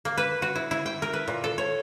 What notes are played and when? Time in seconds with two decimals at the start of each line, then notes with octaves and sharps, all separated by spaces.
0.05 A#3
0.17 B4
0.42 F#4
0.55 E4
0.71 E4
0.86 G5
1.02 A#4
1.13 B4
1.28 A#2
1.44 A4
1.58 C#5